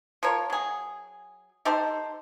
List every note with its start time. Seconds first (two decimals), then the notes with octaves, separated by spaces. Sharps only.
0.23 F3 A#4 C#5
0.50 F#3 G#4
1.65 D#4 G4 A4 C5